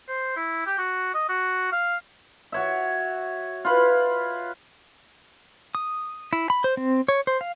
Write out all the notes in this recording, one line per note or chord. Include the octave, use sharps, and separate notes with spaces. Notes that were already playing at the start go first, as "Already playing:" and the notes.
C5
E4
G4
F#4
D#5
F#4
F5
F#4 C#5 E5
F4 B4
D#6
E4
B5
C5
C4
C#5
C5
F5